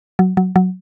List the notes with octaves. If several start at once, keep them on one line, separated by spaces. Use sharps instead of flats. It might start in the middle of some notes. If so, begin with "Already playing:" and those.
F#3
F#3
F#3